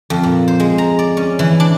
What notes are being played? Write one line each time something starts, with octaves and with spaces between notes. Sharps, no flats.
F2
A#2
C5
G#3
A#5
D5
C#4
E3
D4